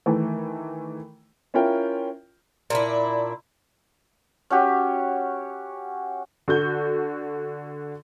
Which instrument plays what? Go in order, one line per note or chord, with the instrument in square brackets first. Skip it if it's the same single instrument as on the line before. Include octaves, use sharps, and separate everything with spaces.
[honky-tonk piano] D#3 E3 A3
[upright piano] C#4 E4 F4 A#4 G5
[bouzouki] A#2 D4 E4
[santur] C#4 F#4 G4
[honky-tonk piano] D3 F#4 G6